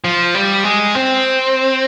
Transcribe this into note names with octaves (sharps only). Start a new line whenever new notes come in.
F3
G3
G#3
C4